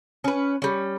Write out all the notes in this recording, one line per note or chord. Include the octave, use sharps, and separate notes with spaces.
C#4 B4
G3 C#4